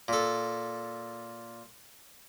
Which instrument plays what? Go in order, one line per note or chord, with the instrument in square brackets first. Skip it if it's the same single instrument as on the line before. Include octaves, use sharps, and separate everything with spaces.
[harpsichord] A#2 A4